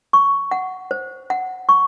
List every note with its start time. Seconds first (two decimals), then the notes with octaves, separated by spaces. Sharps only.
0.13 C#6
0.51 F#5
0.91 C5
1.30 F#5
1.69 C#6